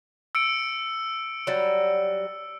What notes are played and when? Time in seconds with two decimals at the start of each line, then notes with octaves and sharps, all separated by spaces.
0.35 E6 C#7 D7
1.47 F#3 G3